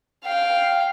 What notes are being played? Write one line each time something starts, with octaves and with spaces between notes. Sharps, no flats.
F5 G5